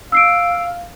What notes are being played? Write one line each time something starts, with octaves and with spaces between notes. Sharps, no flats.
F5 E6 C7 D7